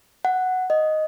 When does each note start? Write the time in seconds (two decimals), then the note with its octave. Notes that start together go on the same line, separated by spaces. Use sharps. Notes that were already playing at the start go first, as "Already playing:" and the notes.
0.25 F#5
0.70 D#5